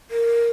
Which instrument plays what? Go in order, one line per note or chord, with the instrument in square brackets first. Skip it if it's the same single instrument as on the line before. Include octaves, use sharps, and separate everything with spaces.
[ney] A#4